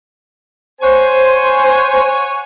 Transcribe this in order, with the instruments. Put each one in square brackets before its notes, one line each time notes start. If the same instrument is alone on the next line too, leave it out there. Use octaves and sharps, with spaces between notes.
[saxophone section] C5 [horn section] C#5 F#5 G#5